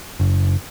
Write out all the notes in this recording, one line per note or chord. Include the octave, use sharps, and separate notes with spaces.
F#1